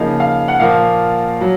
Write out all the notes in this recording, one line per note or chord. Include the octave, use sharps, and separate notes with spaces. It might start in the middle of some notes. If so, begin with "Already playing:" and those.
Already playing: C#3 F3 A#3 D#4 F5
F5
F#5
A#2 F3 A#3 F5
F#3